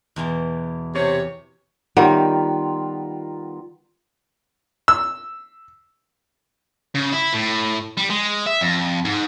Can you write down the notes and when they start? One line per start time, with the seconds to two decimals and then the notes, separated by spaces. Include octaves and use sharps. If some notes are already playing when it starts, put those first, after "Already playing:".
0.16 E2 B2 E3
0.95 C3 C#5
1.97 D#3 G3 B3 F4 A#4 C#5 E5 F#5
4.88 E6
6.95 C#3
7.12 E4
7.33 A2
7.97 G3
8.10 G#3
8.46 E5
8.61 F2
9.05 G#2